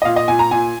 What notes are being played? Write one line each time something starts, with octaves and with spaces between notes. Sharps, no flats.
D#5
A#2 F5
D#5
A#2 G#5
A#5
A#2 G#5